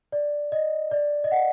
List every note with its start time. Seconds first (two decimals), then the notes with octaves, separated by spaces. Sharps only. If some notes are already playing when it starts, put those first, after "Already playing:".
0.12 D5
0.52 D#5
0.91 D5
1.24 D#5
1.31 F#5